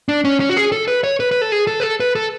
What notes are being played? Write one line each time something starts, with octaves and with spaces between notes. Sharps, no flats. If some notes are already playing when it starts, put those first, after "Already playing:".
D4
C#4
C#4
F#4
G#4
A4
B4
C#5
B4
B4
A4
G#4
A4
B4
A4
B4
A4